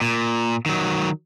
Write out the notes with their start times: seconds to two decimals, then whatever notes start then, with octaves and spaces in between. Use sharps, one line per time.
0.01 A#2
0.66 D#3 F#3